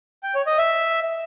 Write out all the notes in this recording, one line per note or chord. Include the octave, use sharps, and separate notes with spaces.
G5
C#5
D#5
E5